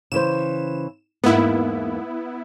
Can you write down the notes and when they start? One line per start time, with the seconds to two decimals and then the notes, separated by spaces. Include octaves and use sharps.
0.12 C#3 E3 C5 E7
1.24 E2 G#2 A#3 B3 E4